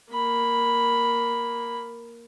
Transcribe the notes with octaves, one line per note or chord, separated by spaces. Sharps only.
A#3 B5